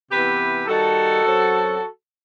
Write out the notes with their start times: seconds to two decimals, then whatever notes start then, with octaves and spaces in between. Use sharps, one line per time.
0.11 C3 E3 B3 E4 G4 B4
0.67 D#3 G3 D#4 F#4 A4
1.23 F#2 F#3 C4